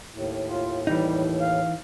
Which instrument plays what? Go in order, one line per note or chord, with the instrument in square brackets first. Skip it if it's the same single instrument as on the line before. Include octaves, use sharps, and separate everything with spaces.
[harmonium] D#2 A2
[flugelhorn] F4
[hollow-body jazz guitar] E3 D#4 [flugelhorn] G3
[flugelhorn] F5